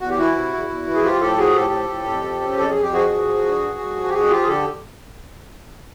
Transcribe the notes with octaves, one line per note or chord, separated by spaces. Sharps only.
E2 F#4
G4
E3 E4 F#4
C3
E2
E2
E3
G#4
F3 F4 G4
A2 G4 A4
F3 F#4 G#4
A2 G4 A4
F3
A2
F2
F3
C#3
F2 A4
G#4
F2
G4
F3 F#4 G#4
G2
F3
D3
G2
G2
F3
G4
F2 F#4 G#4
F3 F4 G4
G#4
D3 G4 A4